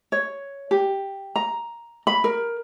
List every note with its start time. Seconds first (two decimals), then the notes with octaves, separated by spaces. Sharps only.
0.12 C#5
0.71 G4
1.36 A#5
2.07 B5
2.24 A#4